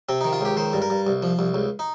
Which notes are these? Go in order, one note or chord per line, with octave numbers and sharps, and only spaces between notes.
C3 C4
D#4
D#3
F4
C#2 G4
D#3 C5
G2
A#4
G2
C2
F3
C2
C#2
D#4